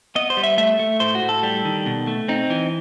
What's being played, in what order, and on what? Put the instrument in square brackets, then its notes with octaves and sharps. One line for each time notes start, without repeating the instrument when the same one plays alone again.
[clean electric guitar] B3 D#5
C5
G3
E5
A3 E5
A3
A2 C5
F#4
A2
A4
G3
D#3
B2
A3
C4 D#4
E3